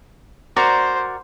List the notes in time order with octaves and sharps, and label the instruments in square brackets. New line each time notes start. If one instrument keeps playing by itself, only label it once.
[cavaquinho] F#4 A#4 D5 [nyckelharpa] C5 [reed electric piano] A#5 D6